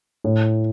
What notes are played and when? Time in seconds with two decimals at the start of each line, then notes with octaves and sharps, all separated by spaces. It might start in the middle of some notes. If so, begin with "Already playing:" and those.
0.24 A2